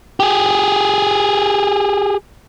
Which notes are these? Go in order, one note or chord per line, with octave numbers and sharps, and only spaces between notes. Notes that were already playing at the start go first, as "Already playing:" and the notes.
G4 G#4